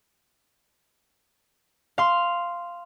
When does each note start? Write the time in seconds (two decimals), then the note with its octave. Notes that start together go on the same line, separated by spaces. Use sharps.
1.98 F5 C6